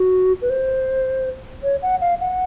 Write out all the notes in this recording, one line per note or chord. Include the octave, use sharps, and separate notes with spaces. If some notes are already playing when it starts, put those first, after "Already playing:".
Already playing: F#4
B4
C5
C#5
F#5
F5
F#5